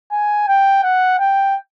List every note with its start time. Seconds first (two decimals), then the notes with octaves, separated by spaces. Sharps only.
0.11 G#5
0.48 G5
0.83 F#5
1.19 G5